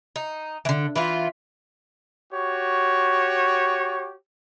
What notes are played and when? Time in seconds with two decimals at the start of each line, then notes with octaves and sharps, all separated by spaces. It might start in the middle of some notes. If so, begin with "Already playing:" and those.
0.16 D#4
0.65 D3 E3
0.96 E3 B3 F4
2.31 F#4 G4 C#5